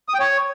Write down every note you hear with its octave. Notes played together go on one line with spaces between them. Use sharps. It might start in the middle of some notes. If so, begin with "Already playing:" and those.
D#6
G5
C#5